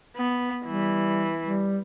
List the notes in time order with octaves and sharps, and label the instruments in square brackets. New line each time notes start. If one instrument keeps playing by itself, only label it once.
[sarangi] B3
[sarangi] E3 [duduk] G3
[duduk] G3